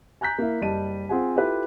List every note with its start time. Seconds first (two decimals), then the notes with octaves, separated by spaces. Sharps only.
0.21 G#5 A#5 F#6 G6 B6
0.38 A#3 E4
0.61 F#1 G3 D#5 A5 D#7
1.09 C4 F4 G#4 F#5 G#5
1.36 E4 F4 G4 A4 B4